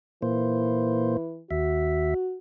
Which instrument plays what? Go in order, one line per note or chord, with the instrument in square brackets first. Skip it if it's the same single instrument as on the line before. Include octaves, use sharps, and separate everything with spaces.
[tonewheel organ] A#2 A#3 C5 [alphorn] E3
[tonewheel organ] D#2 E5 [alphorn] F#4